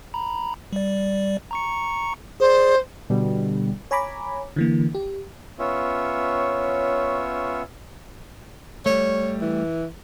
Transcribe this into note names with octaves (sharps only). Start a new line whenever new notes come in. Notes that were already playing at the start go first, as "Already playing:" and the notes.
A#5 B5
G3 D5
A#5 C#6 C#7
G#4 C5 D5
B2 D3 G3
C#5 G#5 A#5 B5 D6
D3 E3 A#3
G4
B3 C#4 F4 C#5 E5
G3 A3 C#5
E3